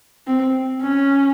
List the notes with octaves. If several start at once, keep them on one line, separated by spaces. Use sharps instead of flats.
C4
C#4